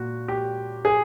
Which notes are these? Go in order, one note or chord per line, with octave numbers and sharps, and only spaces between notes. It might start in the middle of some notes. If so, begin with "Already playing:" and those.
Already playing: A#2 F#4
G4
G#4